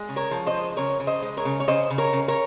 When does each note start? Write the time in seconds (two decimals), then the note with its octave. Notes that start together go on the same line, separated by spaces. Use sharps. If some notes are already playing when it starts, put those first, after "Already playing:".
Already playing: G#3
0.09 C#3
0.16 A#4 C#5
0.31 F3
0.46 C5 D#5
0.54 G#3
0.77 C#3 A#4 C#5
1.00 C#3
1.07 C5 D#5
1.22 G#3
1.37 A#4 C#5
1.45 C#3
1.60 C#5
1.68 C#3 C5 D#5
1.90 C#3
1.98 A#4 C#5
2.13 C#3
2.28 A#4 C#5